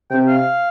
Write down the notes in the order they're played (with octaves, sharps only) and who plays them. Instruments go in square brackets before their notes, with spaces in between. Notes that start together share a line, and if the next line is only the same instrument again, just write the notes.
[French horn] C3 [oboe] G5
[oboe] F5